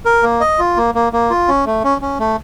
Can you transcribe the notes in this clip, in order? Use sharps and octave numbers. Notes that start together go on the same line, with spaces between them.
A#4
A#3
D#5
F4
A#3
A#3
A#3
F4
C#4
A3
C#4
C#4
A3